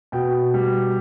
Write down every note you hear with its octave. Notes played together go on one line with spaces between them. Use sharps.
B2 G5
G3